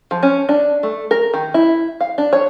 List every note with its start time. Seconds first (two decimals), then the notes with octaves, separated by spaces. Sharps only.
0.11 F3
0.23 C#4
0.49 D4
0.83 A3
1.11 A#4
1.34 D#3
1.54 E4
2.01 F5
2.18 D4
2.33 C#5